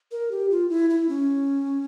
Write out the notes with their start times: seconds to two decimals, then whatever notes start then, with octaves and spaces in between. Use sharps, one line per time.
0.12 A#4
0.31 G4
0.50 F4
0.69 E4
0.90 E4
1.09 C#4